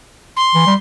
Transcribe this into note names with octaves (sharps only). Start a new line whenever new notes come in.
C6
E3
G3